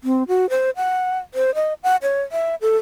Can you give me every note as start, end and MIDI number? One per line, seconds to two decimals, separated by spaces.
0.04 0.23 60
0.28 0.49 66
0.50 0.70 72
0.76 1.18 78
1.34 1.54 72
1.55 1.74 75
1.83 1.96 78
2.02 2.22 73
2.32 2.55 76
2.61 2.77 69